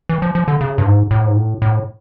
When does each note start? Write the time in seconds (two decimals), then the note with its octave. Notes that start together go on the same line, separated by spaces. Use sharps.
0.09 E3
0.22 F3
0.35 F3
0.48 D3
0.61 C#3
0.78 G2
0.86 G#2
1.11 A2
1.27 G#2
1.36 A2
1.62 A2